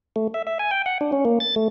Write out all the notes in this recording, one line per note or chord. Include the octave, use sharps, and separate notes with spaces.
A3
E5
E5
G#5
G5
F#5
D4
C#4
A#3
A6
A3